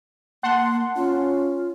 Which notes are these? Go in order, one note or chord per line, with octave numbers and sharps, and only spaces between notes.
A#3 F#5 A5 C6
C#4 F4